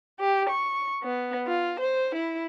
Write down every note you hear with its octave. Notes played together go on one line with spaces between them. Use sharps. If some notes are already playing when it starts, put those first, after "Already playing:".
G4
C#6
B3
F4
C5
E4